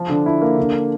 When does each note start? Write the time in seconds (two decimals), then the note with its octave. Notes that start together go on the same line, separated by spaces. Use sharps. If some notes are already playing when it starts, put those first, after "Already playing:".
Already playing: F3
0.09 D3
0.26 E4
0.41 A#3
0.58 D3